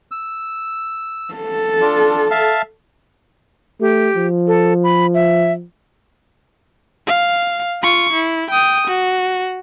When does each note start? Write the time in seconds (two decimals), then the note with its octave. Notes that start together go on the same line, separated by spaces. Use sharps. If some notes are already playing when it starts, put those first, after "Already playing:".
0.11 E6
1.34 A4
1.81 D4 F4
2.31 E5 F5 A5
3.81 A3 G4
4.16 F3
4.47 A4
4.84 B5
5.14 E5
7.07 F5
7.83 F4 C#6
8.13 E4
8.50 G5 D#6
8.87 F#4